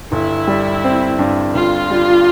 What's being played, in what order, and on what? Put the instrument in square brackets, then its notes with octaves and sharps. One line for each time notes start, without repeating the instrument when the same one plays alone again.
[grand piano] G1 [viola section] E4
[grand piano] G3
C4
G2
[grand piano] G1 [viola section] F4
[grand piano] G3